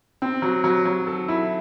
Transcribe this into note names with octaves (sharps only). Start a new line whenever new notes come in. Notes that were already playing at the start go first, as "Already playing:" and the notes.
C4
F#3
F#3
F#3
A4
E4